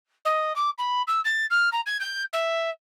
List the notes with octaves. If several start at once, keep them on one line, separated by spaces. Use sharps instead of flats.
D#5
D6
B5
E6
A6
F6
A#5
G#6
G6
E5